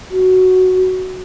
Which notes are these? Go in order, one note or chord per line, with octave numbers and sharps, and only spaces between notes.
F#4